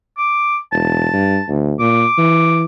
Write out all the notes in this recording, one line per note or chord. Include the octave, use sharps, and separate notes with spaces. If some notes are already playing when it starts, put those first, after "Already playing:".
D6
E1 A5
G2
D2
A#2 D6
E3